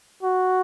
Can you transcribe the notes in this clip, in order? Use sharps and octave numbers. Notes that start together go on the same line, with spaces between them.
F#4